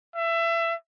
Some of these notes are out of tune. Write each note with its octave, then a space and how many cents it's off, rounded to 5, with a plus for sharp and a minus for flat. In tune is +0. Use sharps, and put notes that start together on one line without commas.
E5 +25